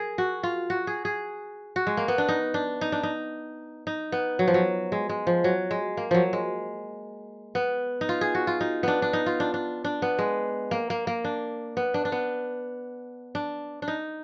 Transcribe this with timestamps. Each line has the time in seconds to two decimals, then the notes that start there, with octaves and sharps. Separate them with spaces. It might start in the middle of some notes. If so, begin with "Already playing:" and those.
Already playing: G#4 A#4
0.18 F#4
0.43 F4
0.70 F#4
0.87 G#4
1.05 G#4
1.76 F#4
1.87 G#3
1.97 A#3
2.08 B3
2.18 D4
2.29 D#4
2.54 D4
2.81 D#4
2.92 D4
3.03 D#4
3.87 D#4
4.12 B3
4.39 F#3
4.48 F3
4.54 F#3
4.92 G#3
5.09 G#3
5.27 F3
5.44 F#3
5.71 G#3
5.97 A#3
6.11 F3 F#3
6.33 G#3
7.55 B3
8.01 D#4
8.09 F4
8.21 G#4
8.35 F#4
8.47 F4
8.61 D#4
8.83 B3 D4
9.02 D4
9.13 D#4
9.26 F4
9.40 D4
9.54 D4
9.85 D4
10.02 B3
10.19 G#3
10.71 A#3
10.90 A#3
11.07 A#3
11.25 D4
11.77 B3
11.94 D4
12.05 D4
12.12 B3
13.35 D4
13.82 D4
13.88 D#4